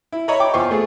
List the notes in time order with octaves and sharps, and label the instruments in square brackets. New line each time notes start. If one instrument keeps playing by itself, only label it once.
[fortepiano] E4
C#5 D#5 E5 A#5 B5
G5 D6
E2 F4 C5 G#5 C#6
A3 G#4